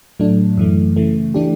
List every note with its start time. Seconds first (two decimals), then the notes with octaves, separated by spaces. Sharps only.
0.19 A2 F#3 A3 D4
0.57 F#2 E3 A3
0.96 C#3 E3 A3
1.34 E3 A3 D4 G4